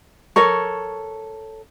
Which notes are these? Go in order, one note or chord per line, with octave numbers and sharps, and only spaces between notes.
A4 A#4 C#5 C#6